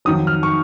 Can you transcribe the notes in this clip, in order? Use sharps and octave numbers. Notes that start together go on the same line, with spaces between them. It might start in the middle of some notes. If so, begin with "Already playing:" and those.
F2 D#3 F#3 D#6
F6
C#6